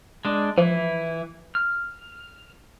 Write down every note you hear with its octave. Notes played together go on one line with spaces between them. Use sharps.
G#3 D4
E3 F3 E4
F6